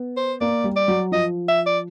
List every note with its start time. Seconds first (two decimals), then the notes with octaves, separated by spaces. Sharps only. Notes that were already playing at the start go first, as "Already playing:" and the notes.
Already playing: B3
0.17 C5
0.41 A#3 D5
0.64 G3
0.76 D5
0.88 F#3
1.12 F3 D#5
1.48 E5
1.66 D5